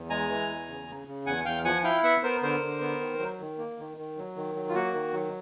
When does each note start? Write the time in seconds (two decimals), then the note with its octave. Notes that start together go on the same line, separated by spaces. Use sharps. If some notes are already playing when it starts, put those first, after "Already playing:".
Already playing: E2
0.10 G#3 G#5 A#5
0.29 E3
0.48 E2
0.68 C#3
0.88 C#3
1.07 C#3
1.26 E2 F#5 G#5
1.45 E2 F5 G5
1.65 F3 F#5 G#5
1.84 E4 F5 G5
2.03 B3 E5 F#5
2.23 B3 A#4 C5
2.43 D3 A#4 C5
2.61 D3
2.81 B3
3.00 D#3
3.19 F#3
3.40 D#3
3.58 A#3
3.78 D#3
3.97 D#3
4.17 F#3
4.37 D#3
4.55 F#3
4.69 F4
4.74 A#3 F#4
4.94 D#3
5.13 F#3